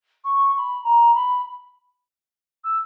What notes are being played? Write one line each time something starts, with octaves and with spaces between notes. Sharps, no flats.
C#6
C#6
B5
A#5
B5
E6